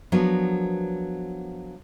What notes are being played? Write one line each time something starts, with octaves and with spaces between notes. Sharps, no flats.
F3 F#3 B3 D4 A#4